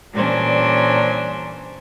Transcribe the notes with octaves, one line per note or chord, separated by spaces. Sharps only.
A#2 E3 G3 C#4 D4 C5